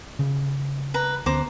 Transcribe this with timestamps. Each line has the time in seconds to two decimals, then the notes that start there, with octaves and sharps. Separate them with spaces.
0.19 C#3
0.94 B4 A#5
1.26 D2 B3 C#4 C5 A#5 D6